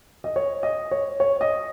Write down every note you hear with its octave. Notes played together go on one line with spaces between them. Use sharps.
D#5
C#5
D#5
C#5
C#5
D#5